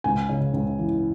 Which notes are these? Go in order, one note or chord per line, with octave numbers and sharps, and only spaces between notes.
C#2 G#5
C#3
C#2
E3